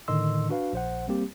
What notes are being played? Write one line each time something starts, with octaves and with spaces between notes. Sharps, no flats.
A2 D3 D#3 D#5 C6 E6
D4 F#4 B4 F5
A#1 C5 F#5
G3 A#3 C4 G4